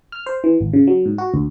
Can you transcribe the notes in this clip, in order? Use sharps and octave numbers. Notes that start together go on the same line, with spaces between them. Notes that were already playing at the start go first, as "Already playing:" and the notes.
F6
C5
E3
G#1
C#3
F#3
G#2
F#4
D2